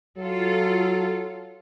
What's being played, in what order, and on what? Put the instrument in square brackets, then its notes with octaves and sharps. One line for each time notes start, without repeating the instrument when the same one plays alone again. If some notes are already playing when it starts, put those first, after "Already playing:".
[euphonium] F#3 [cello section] F4 A4